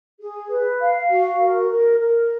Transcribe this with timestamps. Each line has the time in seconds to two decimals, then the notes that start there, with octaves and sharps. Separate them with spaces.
0.20 G#4
0.50 B4
0.80 F5
1.10 F#4
1.39 A#4
1.70 A#4
2.00 A#4